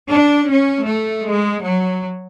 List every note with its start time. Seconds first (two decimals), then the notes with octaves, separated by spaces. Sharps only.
0.08 D4
0.47 C#4
0.86 A3
1.25 G#3
1.64 F#3